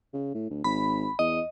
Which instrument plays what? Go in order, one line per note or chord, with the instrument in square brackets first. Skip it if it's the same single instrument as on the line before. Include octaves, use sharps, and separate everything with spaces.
[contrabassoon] C#3
A2
D2
[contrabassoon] G#1 [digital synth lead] B5
[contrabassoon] E2 [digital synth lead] D#5